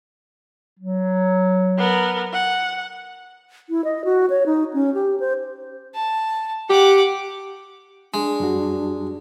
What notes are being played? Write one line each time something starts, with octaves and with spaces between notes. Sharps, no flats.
F#3
B3 A#4
F#5
E4
D#5
F#4
C#5
D#4
C#4
G4
C5
A5
G4 F#5 D6
G#3 D4
F#2 G3 F#4